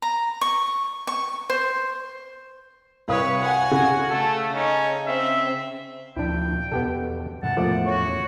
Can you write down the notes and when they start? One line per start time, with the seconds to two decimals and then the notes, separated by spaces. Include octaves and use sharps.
0.02 A#5
0.41 C#6
1.07 C#6
1.50 C5
3.08 C2 B4 C#5 F5 D#6
3.42 F#4 F#5 G#5
3.71 C#3
4.10 A3 A4
4.55 C#4 D#4
5.07 C4 E5
6.16 D2 A#2 F3 D4 E4 G5
6.72 E2 B2 B3 G4 A4
7.43 G#2 C3 E3 F#5 A5
7.57 E2 A2 C#3 F3 A3 A#3 D5
7.86 F#4 C#5